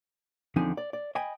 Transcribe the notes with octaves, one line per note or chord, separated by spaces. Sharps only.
E2 D3 F3 C4 D#4 G#5
D5
D5
D#5 G5 G#5 B5